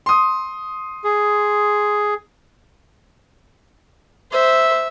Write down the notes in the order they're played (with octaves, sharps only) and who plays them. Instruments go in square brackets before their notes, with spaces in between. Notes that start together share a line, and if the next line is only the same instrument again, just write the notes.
[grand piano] C6 D#6
[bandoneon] G#4
[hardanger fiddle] C5 [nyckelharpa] E5